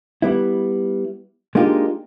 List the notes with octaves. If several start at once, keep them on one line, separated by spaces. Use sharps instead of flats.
G3 B3 E4
G#3 A#3 D4 D#4 F4 G4